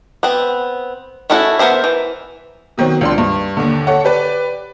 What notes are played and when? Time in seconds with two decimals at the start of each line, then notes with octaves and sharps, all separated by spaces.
0.23 B3 C4
1.30 A3 C#4 E4 F#4 A4
1.59 B3 A#4 C5 E5
1.84 E3
2.78 B2 D#3 F#3 C4
3.01 C#2 D4 C6
3.18 G2
3.57 D#2 D3
3.87 A4 C#5 F#5
4.05 G4 B4 D5